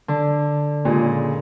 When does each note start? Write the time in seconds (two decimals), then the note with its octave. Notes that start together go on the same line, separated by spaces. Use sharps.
0.08 D3
0.85 A#2 C#3 G#3